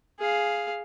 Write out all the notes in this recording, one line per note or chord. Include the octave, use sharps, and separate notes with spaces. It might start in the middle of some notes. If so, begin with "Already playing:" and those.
G#4 F5